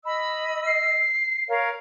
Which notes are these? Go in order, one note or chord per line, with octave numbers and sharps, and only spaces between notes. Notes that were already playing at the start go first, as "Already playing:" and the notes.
D#5 B5 E6
C7
A#4 C#5 F5